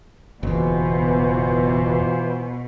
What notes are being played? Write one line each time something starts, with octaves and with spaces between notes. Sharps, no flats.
F#1 E2 B2 E3 F4 C5